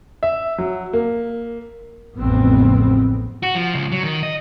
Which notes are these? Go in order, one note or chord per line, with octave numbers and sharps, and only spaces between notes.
E5
F#3
A#3
A1 F2 C#3 B3 C4
F#4
F3
C#2
F#3
D#3
D#5